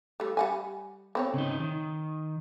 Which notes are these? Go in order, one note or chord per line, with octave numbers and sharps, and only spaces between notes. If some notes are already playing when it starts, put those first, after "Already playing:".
G3 A3
G3 F#5 G#5
B3 C4 C#5
C#3 D#4
D#3